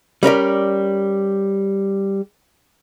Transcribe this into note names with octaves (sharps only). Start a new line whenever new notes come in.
G3 C#4 A#4 D5